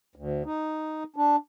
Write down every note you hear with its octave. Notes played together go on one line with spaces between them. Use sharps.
D2
D#4
D4